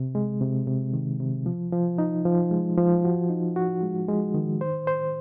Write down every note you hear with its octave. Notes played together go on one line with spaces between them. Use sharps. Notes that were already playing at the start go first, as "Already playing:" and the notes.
Already playing: C3
G#3
C3
C3
D#3
C3
F3
F3
D#4
F3
G#3
F3
F#4
D#4
F#4
G#3
G#3
D#3
C5
C5